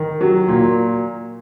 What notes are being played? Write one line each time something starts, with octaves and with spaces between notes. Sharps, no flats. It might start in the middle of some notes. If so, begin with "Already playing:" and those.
Already playing: D#3
F#3
A#2